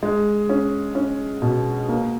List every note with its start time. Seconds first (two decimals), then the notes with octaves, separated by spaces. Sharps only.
0.03 G#3
0.49 C#4
0.95 C#4
1.42 B2
1.89 A#3